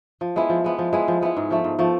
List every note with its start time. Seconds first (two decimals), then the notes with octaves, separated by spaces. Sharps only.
0.21 F3
0.36 G#3 B3 E4
0.49 F3
0.64 G#3 B3 E4
0.78 F3
0.92 G#3 B3 E4
1.08 F3
1.21 G#3 B3 E4
1.37 G#2
1.51 F3 A3
1.64 G#2
1.79 F3 A3